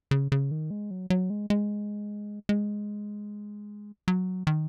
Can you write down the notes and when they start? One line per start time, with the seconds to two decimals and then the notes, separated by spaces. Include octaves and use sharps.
0.11 C#3
0.32 C#3
0.51 D#3
0.71 G#3
0.91 F#3
1.10 F#3
1.30 G#3
1.50 G#3
2.49 G#3
4.08 F#3
4.47 D#3